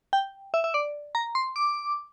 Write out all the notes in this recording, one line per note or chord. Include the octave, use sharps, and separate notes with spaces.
G5
E5
E5
D5
A#5
C6
D6